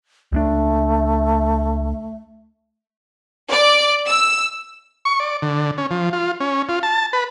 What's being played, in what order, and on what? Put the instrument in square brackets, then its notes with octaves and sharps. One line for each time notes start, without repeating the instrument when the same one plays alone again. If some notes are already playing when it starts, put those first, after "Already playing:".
[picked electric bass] C#2 G#3 D4 [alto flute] A3
[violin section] D5
E6
[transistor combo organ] C#6
D5
D3
C#4
F3
F4
C#4
F4
A5
B4